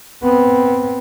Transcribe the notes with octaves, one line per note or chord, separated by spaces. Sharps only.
B3 C4